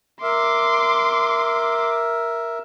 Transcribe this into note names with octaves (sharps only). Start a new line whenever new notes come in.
A#4 E5 C6 D6